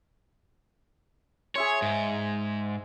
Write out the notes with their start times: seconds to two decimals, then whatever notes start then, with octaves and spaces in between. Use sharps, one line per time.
1.55 G#4 C#5 E5 C6
1.82 G#2